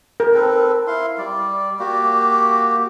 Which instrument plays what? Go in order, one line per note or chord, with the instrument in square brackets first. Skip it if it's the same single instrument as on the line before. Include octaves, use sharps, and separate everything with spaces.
[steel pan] A#4
[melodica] C4 A4 B4
E4 F5 C6
G3 D5
A#3 F#4 G4